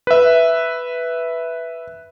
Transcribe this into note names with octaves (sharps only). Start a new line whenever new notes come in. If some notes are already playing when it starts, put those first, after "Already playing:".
B4 E5